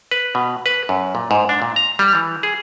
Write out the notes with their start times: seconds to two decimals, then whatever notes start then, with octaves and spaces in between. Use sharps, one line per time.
0.11 B4
0.35 B2
0.66 B4
0.89 F#2
1.15 A#2
1.31 G#2
1.49 D4
1.62 A#2
1.76 A#5
1.99 G3
2.15 E3
2.43 G#4